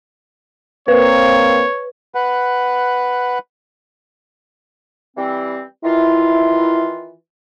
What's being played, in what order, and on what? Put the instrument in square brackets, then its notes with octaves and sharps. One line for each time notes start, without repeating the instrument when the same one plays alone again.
[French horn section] A#3 C4 [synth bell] B4 [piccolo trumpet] C#5
[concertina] B4 F#5
[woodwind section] E3 G3 C4
[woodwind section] D#3 E3 F4 [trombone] E4